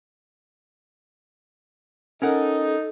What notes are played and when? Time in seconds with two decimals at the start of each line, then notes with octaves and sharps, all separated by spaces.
2.22 C#4 D#4 A4 A#4 F#5